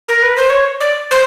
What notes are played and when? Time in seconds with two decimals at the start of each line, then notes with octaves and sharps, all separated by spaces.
0.08 A#4
0.23 B4
0.36 C5
0.50 C#5
0.80 D5
1.11 C5